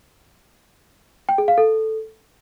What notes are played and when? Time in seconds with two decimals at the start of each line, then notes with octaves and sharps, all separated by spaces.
1.29 G5
1.38 G#4
1.48 F5
1.58 A4